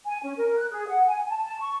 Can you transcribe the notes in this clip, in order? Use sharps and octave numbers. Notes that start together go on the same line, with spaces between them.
G#5
C#4
A#4
F#6
G#4
F#5
G#5
A5
A5
C#6